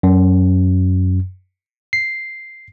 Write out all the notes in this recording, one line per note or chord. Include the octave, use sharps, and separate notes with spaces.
F#2
C7